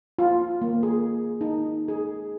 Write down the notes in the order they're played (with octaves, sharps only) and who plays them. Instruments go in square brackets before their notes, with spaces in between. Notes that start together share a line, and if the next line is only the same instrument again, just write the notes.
[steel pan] F4
A#3
G#4
D#4
G#4